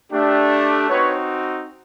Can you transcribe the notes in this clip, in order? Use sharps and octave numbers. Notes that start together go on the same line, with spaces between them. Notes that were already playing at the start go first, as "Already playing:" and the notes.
A3 D4 G4
C4 D#4 F#4 B4 C#5